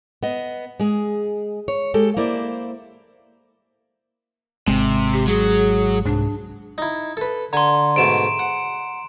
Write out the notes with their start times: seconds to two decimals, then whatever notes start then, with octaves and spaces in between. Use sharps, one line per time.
0.23 B3 D#5
0.80 G#3 G#4
1.68 C#5
1.94 G#3 G4 A4
2.17 A#3 E4 C5 D5
4.68 G#1 C3 G#3
5.13 G4
5.27 F#3 G#4
6.05 C2 G#2 D4
6.78 D#4 E4
7.17 A4 B4
7.53 D3 G#5 A#5 C6
7.96 G#2 B2 A3 D7 E7
8.39 F#5